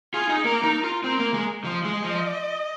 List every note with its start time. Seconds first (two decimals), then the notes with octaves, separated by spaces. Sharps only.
0.14 F4 G#4
0.29 D#4
0.44 A#3 A#4
0.64 D#4
0.84 F4
1.04 C4 A#4
1.19 A#3
1.34 G#3
1.64 F3 D#5
1.84 G#3
2.04 F3